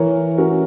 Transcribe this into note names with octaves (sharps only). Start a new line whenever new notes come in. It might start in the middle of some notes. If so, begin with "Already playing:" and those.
Already playing: E3 A#4 C#5
C#4 F#4 A#4